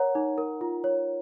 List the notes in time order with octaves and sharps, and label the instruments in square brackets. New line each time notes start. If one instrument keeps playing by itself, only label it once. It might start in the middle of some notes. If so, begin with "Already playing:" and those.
Already playing: [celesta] A#4 C#5 F#5 A#5
D#4
A#4
F4
C#5